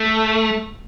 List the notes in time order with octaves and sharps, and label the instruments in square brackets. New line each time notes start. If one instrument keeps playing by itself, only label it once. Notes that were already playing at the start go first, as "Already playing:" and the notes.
Already playing: [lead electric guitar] A3